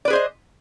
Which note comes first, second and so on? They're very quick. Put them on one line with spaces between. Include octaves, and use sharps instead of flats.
D5 B4 G#4 C5 D#5